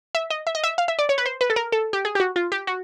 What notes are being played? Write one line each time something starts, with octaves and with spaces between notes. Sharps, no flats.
E5
D#5
E5
D#5
E5
F5
E5
D5
C#5
B4
C5
B4
A4
A#4
A4
G4
G#4
G4
F#4
F4
G4
F#4